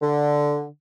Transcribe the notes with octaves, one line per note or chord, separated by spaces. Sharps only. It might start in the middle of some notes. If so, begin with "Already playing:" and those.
D3